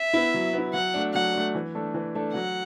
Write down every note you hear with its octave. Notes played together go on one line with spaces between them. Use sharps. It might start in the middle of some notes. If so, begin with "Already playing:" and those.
Already playing: E5
B3 E4
F#3
B3 E4
F#3 F#5
A3 D4
F#3 F#5
A3 D4
E3
A3 D4 A4
E3
A3 D4 A4
F#3 F#5